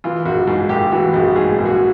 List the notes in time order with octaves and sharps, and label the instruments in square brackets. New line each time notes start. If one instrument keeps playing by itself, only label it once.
[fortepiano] E3 F4
A#1 F#4
G#2 F#4
A#1 G4
E3 F#4
A#1 F#4
G#2 G#4
A#1
F#4